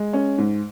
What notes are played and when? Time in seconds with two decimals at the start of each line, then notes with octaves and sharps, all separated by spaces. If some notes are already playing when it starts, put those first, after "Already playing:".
Already playing: G#3
0.13 C#4
0.38 G#2